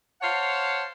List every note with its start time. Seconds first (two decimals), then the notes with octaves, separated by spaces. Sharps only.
0.22 C5 C#5 F5 F#5 A5